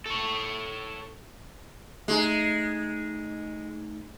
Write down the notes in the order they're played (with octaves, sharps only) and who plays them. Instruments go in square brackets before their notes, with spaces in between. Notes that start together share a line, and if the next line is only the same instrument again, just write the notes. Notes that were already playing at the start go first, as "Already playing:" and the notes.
[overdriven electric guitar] A4 C#5
[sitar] G#3 [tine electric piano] A3 D#4